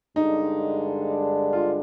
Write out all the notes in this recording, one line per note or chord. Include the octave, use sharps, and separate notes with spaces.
G2 D3 G#3 D4 D#4
F4